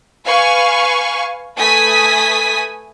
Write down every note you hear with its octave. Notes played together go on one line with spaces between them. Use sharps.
B4 F5 G#5 C#6
A3 B4 G#5 D#6 B6